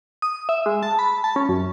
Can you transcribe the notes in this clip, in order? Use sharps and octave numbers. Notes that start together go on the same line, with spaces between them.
D#6
E5
G#3
A5
B5
A5
C#4
F#2